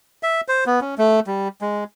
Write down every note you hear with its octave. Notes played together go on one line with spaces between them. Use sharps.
E5
C5
B3
C#4
A3
G3
G#3